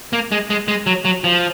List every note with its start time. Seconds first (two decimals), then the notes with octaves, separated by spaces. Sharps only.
0.13 A#3
0.32 G#3
0.50 G#3
0.68 G#3
0.87 F#3
1.05 F#3
1.24 F3